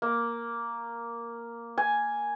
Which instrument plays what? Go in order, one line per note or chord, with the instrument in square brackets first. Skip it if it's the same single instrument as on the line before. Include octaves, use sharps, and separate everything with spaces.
[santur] A#3
G#5